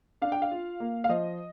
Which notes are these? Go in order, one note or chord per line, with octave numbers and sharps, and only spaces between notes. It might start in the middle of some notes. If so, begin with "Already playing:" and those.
D4 F5
G5
F5
F4
A#3
F5
F3 D#5